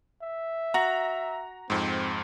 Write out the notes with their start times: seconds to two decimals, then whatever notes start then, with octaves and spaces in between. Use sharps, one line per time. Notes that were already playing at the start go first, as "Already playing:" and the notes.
0.23 E5
0.74 F#4 A#5
1.70 F2 G#2 C4